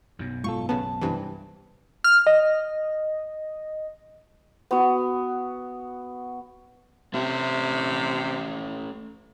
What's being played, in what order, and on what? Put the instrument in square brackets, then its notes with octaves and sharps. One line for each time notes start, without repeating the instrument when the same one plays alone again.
[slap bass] B1 F#2
[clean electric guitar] G#2 F4 A4 [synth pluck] C#6
[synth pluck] C#3 B3 [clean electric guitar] A5
[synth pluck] G2 C3 E3
[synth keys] F6
D#5
[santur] B3 F#4
[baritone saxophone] C3 [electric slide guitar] A3 C#4 E5